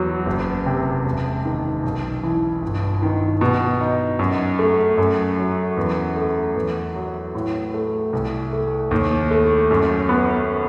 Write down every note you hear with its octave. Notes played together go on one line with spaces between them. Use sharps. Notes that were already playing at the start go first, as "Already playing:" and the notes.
Already playing: E2 F#3
F#1
C3
E1
D#3
B1
E3
G1
D#3
B2
D#4
F#2
A3
F#2
F#3
E2
A3
E2
F#3
A2
A3
C2
A3
D#2
A3
F#2
B3